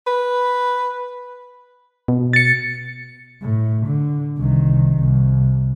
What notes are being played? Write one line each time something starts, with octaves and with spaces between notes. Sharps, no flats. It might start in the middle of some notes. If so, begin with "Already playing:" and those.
B4
B2
A6 C#7
A2
D3
C2 D#3
C2